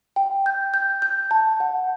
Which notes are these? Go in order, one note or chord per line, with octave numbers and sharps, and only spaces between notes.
G5
G6
G6
G6
A5
F#5